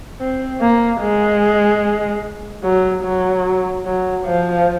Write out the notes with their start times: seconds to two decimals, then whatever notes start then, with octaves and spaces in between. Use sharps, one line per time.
0.20 C4
0.61 A#3
1.01 G#3
2.63 F#3
3.04 F#3
3.85 F#3
4.25 F3